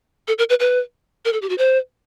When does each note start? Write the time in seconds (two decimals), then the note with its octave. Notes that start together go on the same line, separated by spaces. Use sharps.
0.28 A4
0.38 A#4
0.50 B4
0.60 B4
1.25 A#4
1.33 A4
1.42 G4
1.49 F#4
1.58 C5